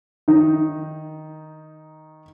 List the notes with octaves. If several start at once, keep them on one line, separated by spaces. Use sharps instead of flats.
D#3 D#4